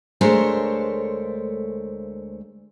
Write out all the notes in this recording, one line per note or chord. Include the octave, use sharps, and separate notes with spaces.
D2 G#3 A3 A#4 C5 C#5